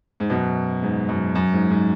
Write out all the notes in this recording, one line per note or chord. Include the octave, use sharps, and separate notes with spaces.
G#2
F#2 B2
G#2
F#2
F#2
G#2
G#2